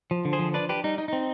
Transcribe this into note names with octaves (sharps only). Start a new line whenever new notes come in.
F3
D3
G#4 C5
F3
D4 B4 D5
D4 G4 B4
G3 D#4
D#4
C4 D#4